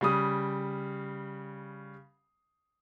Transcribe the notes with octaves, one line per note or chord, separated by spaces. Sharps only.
C#3 G3 D#6